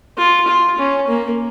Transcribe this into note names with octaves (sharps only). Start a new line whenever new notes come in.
F4
F4
C#4
A#3